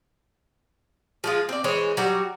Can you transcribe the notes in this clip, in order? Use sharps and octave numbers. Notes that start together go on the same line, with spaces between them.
F3 G#3 F4
C4 D5
E3 G#3 C5 C#5
F#3 G3 F#4